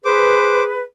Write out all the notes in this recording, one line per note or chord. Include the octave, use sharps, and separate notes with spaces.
G#4 B4 C5 D6